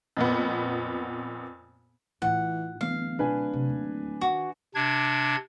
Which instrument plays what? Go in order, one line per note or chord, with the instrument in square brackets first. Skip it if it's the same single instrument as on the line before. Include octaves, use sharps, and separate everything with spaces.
[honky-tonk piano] F2 A#2 B3
[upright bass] A2 F4 [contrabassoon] E3 [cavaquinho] F#5
[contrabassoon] D1 [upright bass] E3 B3 [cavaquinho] F5
[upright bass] B2 F4 [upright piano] D4 B4 G#5
[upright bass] C3
D#2
[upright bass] D#3 [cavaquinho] F#4
[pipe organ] C3 D4 G#6